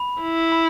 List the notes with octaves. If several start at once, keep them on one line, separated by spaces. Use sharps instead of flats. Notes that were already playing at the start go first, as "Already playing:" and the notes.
Already playing: B5
E4
B5